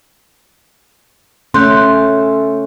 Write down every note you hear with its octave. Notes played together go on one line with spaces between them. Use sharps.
A3 C#4 C6 F#6 G6